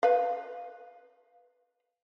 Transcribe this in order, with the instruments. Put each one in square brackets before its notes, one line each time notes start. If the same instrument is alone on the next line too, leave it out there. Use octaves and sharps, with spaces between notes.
[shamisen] B4 F5